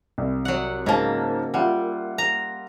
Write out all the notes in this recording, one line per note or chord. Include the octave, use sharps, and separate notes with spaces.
C2
F#3 F#5
G#2 C#3 A#3 A5
G3 F4 E5 F#5
A#5